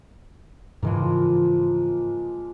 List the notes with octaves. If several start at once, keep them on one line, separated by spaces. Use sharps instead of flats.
G#2 C#3 E3 F3 G#3 A#3